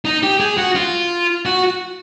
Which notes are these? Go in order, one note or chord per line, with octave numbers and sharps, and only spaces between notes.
D#4
G4
G#4
F#4
F4
F#4